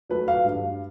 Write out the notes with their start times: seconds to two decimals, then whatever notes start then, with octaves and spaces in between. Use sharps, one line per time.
0.09 F#3 A3 B4
0.28 F5
0.45 G2